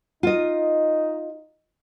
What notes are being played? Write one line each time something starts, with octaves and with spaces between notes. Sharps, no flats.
D#4 F4 D#5